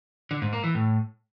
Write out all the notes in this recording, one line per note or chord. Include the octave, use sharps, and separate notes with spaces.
D3
G#2
A#3
E3
A2